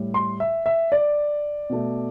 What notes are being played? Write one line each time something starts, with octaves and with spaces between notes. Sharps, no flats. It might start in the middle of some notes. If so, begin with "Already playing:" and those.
Already playing: A2 G3
C6
E5
E5
D5
B2 A3